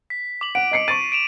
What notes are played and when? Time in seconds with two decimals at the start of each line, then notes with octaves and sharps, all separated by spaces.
0.10 B6
0.41 D6 F#7
0.55 F#5 D7
0.72 D#5 C7 C#7
0.88 C#6 A6 D#7
1.12 D7 E7 F7